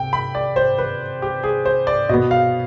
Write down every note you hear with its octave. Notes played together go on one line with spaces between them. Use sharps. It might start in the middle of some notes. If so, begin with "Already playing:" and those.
Already playing: C3 G5
B5
D5
C5
B4
G4
G#4
C5
D5
B2 B3 D#5
F5